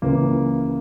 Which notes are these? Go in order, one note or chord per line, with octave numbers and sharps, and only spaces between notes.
C#2 C#3 E3 A#3